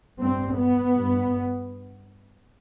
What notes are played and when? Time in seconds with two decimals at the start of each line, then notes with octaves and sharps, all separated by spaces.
0.20 G2 C4
0.56 B3
0.95 G2